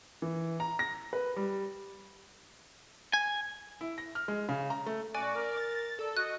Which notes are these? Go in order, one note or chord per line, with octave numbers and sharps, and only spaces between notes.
E3
A#5
A#6
B4
G3
G#5
E4
A#6
F6
G#3
C#3
A#5
A3
B2 C#4 F#4 D5 G#5
A#4
A6
A4 D5 E6
F#4 D#5 F#6